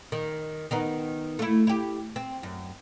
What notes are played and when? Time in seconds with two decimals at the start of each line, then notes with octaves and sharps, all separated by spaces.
0.12 D#3
0.71 D#3 B3 D#4
1.39 A3 E4
1.67 E4 G4
2.16 C4
2.43 F#2